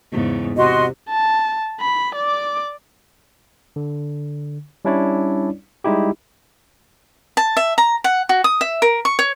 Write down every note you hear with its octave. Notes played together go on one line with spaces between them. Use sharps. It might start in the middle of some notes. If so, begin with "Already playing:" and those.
E2 G#2 C#3
C3 F#4 D#5 C6
A5
B5
D5 D6
D3
G3 C#4 D4 E4 C#5 D5
G3 G#3 D#4 E4 G4
A5
E5
A#5
F#5
F#4
D#6
E5
A#4
C#6
C#5